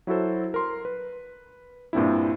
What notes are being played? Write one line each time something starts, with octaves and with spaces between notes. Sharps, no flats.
F#3 E4 F#4 A4 C5
A#4 C6
B4
G2 A#2 C4 D4 E4